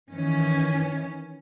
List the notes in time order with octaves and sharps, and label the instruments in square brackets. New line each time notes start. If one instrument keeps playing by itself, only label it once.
[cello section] D#3 E3 C#4